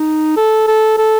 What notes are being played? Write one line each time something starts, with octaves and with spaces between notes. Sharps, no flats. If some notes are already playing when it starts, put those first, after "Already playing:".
Already playing: D#4
A4
A4
A4